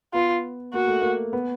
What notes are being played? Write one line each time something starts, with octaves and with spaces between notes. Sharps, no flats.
B3 F4
A#3 F#4
A3
A#3
B3